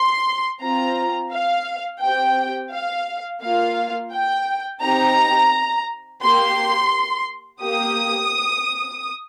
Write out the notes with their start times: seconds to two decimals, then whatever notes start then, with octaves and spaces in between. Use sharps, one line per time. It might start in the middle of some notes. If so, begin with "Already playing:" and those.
Already playing: C6
0.62 C4 F4 A#5
1.33 F5
2.01 C4 G4 G5
2.72 F5
3.42 A#3 F4 F5
4.13 G5
4.81 C4 D#4 G4 A#5
6.23 A#3 G4 C6
7.62 A#3 G4 D#6